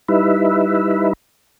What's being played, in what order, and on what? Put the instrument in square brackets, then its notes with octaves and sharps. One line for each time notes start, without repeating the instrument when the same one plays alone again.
[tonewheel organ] G3 D#4 E4 B4 E5